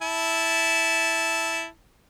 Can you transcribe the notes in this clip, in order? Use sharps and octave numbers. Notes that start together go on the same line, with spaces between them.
E4 A5